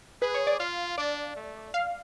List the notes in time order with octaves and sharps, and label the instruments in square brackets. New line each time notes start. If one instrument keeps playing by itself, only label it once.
[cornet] G#4 [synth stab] B4
[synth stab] C#5
D5
[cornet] F4 [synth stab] F5
[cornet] D4 [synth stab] D5
[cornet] A3
[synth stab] F5